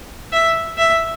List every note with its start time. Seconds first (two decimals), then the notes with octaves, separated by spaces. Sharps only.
0.33 E5
0.78 E5